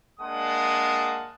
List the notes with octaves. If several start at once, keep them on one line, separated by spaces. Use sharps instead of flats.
G#3 A#3 D4 F#5 A5 D#6